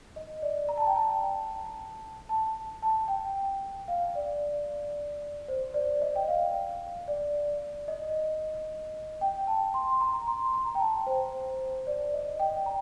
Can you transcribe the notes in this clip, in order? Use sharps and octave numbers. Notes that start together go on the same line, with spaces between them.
D#5
D5
A#5
A5
G5
A5
A5
A5
G5
F5
D5
C5
D5
D#5
G5
F5
D5
D#5
G5
A5
C6
A#5
C6
A#5
G5
A5
C5
D5
D#5
G5
A#5